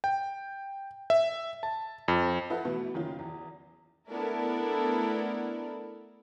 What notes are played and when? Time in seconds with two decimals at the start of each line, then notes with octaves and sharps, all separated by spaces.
0.04 G5
1.10 E5
1.63 A5
2.08 F2
2.50 F4 A4 B4 E5 F#5
2.65 B2 E3 A3 B3
2.94 F#1 D#3 C#4 F4
3.19 E2
4.09 A3 B3 D4 E4 A4 A#4